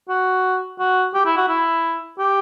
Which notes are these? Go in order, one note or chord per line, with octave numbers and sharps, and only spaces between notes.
F#4
F#4
G4
E4
F#4
E4
G4